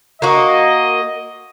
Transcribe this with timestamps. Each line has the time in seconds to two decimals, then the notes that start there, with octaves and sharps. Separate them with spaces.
0.22 A#3 F#4 D#5